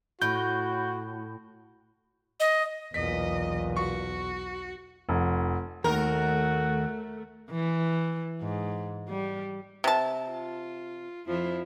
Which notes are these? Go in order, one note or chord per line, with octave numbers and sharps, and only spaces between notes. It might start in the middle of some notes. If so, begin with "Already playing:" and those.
A2 F#4 G6
D#5
B1 E2 A#2 D#5 B6
F#4 C#6
F1
D#2 D#3 A3 F#4 A#4
E3
G#2
G3
C3 A5
F4
F2 F3 E4